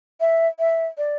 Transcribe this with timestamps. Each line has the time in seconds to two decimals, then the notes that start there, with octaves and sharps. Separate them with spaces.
0.21 E5
0.59 E5
0.98 D5